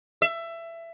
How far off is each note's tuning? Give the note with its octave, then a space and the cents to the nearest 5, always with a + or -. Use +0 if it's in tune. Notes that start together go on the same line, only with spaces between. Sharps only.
E5 +20